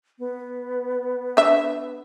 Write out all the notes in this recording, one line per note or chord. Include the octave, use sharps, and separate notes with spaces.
B3
D4 E5